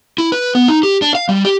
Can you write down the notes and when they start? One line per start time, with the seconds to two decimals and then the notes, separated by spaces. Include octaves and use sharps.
0.18 E4
0.32 B4
0.55 B3
0.68 D#4
0.83 G4
1.02 D4
1.15 F5
1.29 G3
1.45 G4